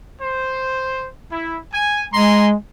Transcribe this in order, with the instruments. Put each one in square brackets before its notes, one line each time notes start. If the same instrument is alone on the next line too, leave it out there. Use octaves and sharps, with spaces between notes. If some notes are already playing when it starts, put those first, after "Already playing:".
[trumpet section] C5
E4
G#5
[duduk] G#3 [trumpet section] G#5 A#5 C6